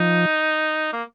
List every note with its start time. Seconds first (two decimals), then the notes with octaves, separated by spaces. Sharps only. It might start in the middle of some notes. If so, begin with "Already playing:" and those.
Already playing: F3 D#4
0.93 A#3